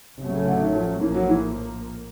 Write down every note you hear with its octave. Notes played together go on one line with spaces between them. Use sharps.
A1 A2 C3 F#3 A3 C#4
C#3
D3
D#3
F3
A#1 A2 E3 F3 A#3
F#3
E3